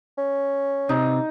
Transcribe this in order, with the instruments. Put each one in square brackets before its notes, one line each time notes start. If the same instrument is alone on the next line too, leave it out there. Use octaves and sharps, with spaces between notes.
[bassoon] C#4
[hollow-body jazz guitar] C3 [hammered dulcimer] D#4